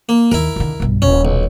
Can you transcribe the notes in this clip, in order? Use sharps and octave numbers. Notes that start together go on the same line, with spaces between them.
A#3
D#2 E4 A#4
D#2 D3
B1 G2
D#1 C#4
B1